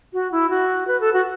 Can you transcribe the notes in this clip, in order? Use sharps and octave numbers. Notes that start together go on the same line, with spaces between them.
F#4
E4
F#4
B4
A4
F#4